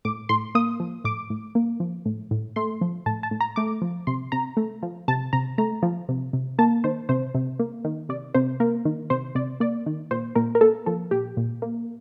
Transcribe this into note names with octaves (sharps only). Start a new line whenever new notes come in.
A2 D6
A2 C6
A#3 D#6
F3
A2 D6
A2
A#3
F3
A2
A2
A3 C6
F3
A2 A5
A5
A2
A#5
A3 D6
F3
C3 C6
C3 A#5
A3
F3
C3 A5
C3 A#5
A3 A#5
F3
C3
C3
A#3 A5
D#3 C5
C3 C5
C3
A#3
D#3
C3 D5
C3 C5
A#3 A#4
D#3
C3 C5
C3 D5
A#3 D5
D#3
A#2 C5
A#2 A#4
A#4
A#3 A4
F3 A4
A#2 G4
A#2
A#3